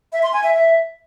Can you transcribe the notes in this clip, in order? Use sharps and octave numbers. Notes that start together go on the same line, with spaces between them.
E5
C6
G#5
E5
E5